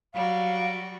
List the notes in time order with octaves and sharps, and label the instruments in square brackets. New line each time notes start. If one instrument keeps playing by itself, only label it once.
[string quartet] F#3 G3 F#4 [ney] F5